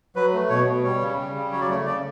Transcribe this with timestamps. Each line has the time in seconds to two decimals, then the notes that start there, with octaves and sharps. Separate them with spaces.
0.16 F#3 B4
0.33 A3
0.50 B2 C#5
0.67 B2
0.84 G3 C#5
1.01 C#3
1.18 G3
1.35 C#3
1.52 F#3 C#5
1.61 D5
1.69 A3 C#5
1.86 C#3 D5